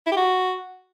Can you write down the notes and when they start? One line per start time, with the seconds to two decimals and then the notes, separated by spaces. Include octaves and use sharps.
0.07 E4
0.12 G4
0.17 F#4